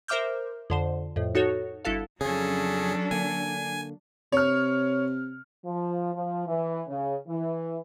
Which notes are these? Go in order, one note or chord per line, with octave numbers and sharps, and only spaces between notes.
A#4 C5 E5 D6 F6 G6
F2 D3 C5
F2 A2
D#4 F#4 A4 C#5
G1 E4 F#4 A4 F5
F2 C#3 F#3 C#4 D4 G#4 A4
D3 A#3 G#5
C3 C#5 F6
F3
F3
E3
C#3
E3